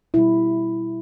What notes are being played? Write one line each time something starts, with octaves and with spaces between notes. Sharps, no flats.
B2 G3 E4